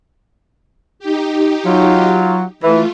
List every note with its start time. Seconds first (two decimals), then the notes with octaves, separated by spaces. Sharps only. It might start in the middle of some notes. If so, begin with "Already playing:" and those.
0.99 D#4 G4
1.65 F#3 F4
2.63 E3 A3 F4